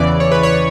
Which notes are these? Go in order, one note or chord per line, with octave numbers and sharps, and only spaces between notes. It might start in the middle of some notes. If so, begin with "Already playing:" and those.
Already playing: E2 C#3 E3 D5
C#5
B4
C#5